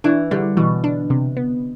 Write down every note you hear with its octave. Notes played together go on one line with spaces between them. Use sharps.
E3 D4
D3 G3
B2 E3
D4
C3
B3